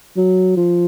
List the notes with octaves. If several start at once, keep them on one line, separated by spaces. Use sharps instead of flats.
F#3
F3